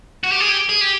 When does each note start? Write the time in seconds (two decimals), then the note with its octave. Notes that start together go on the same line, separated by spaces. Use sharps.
0.24 F#4
0.32 G4
0.40 G#4
0.49 G4
0.69 G#4
0.81 G4